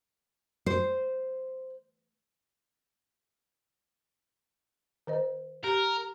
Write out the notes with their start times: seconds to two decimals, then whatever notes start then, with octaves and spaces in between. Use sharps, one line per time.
0.66 C5
5.07 D#3 C5 D#5
5.64 G4 A#4